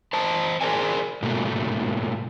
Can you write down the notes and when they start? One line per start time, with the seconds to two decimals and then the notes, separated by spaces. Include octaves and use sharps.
0.13 C5 D#5 A5 A#5
0.61 G#4 A#4 C5 D5 G#5
1.23 G#2 B2 A3 A#3